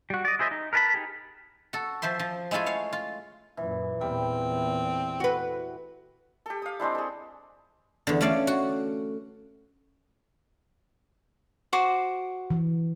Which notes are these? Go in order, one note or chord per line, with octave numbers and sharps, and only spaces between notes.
G3 F#4
D5 D#5
E4 G#4 C5 D#5 E5
D#4
A#4 B4 D5 A5 B5
D#4 G4 G#4
F#4 A4
F3 C5 E5 C6
F3
G#3 A3 E4 F4 G#4
C#5 F5
F4
F#2 A#2 E3
E2 A#2 G3 C4
F#4 B4
G4 A4
F5 D#6
G#3 C4 D4 E4
G#4 A4
E2 D3
A3 C#4 D5 F5
F#4
F#4 C5 D6
E3